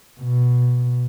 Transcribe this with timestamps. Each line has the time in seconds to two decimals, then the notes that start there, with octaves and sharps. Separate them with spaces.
0.20 B2